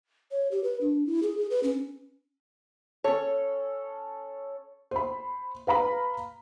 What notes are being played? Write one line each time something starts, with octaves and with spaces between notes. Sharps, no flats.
C#5
G4
B4
D4
E4
G#4
G#4
B4
C#4
C#4 A4 C#5
C5 B5
B4 F5 A#5 B5